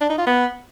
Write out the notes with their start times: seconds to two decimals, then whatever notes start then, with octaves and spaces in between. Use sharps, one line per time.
0.01 D4
0.10 D#4
0.18 F4
0.27 B3